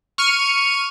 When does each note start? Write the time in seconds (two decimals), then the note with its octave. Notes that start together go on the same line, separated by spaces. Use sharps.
0.18 C#6 F6 C#7 D#7